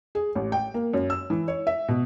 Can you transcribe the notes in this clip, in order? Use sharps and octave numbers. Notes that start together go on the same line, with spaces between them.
G#4
A1
G5
A#3
F#2
E6
E3
C#5
E5
B2